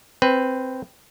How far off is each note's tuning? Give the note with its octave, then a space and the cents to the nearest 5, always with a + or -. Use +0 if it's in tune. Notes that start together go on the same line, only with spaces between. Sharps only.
C4 +0 B4 +10